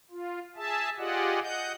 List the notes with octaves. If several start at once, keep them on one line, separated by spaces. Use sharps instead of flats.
F4
G#4 E5 A5
F4 G4 G#4 D5 D#5 F#5
D#5 F#5 G6